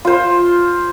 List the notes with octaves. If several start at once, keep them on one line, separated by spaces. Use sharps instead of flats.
F4 C5